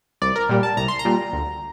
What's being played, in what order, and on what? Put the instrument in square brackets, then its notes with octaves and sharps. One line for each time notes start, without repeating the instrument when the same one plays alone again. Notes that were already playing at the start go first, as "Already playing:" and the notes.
[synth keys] C2 D5
A#4
A#2 G3
A5
C2 A#5
C6
A#5
A#2 G3
D2